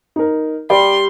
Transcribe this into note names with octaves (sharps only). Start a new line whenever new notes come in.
D#4 A#4
G3 D5 C6